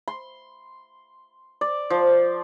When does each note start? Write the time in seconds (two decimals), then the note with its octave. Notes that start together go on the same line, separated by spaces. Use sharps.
0.08 C6
1.61 D5
1.90 F3